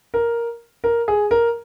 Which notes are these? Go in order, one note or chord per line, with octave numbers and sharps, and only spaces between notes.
A#4
A#4
G#4
A#4